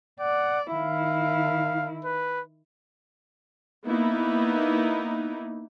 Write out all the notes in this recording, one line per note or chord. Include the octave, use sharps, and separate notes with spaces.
D5 F#5
D#3 E4 F5
B4
A#3 B3 D#4 E4